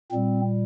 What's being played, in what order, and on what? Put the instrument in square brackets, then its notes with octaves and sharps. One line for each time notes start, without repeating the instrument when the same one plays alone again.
[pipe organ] A#2 G3 C4